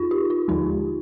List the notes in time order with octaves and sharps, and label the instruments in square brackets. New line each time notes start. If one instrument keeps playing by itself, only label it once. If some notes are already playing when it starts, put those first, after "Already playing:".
Already playing: [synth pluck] F2 [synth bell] D#4 F4
[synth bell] G4
F4
[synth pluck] D#2 D3 F3 G#3 [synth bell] D#4